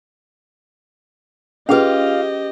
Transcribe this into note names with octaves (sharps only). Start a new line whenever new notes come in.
C#4 F4 G4 G#4 B4 D#5 F5